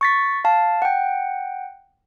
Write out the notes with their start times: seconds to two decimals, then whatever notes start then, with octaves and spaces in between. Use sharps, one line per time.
0.01 C#6 A6 B6
0.45 F5 A5
0.82 F#5 G5